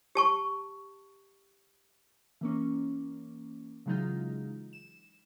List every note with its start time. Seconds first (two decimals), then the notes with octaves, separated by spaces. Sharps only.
0.15 G4 A5 C#6
2.41 E3 A#3 C#4
3.86 C#3 E3 F#3 G#3 D#4 F4
4.73 E7